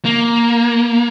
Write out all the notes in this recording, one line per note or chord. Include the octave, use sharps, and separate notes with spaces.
A#3